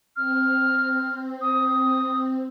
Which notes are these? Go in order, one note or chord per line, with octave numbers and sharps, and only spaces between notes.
C4 F6
D#6